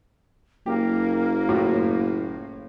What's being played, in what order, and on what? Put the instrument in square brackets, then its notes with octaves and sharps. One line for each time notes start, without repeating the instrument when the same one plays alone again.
[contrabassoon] F#1 [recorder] A#3 [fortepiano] G4
[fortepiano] A2 F4 F#4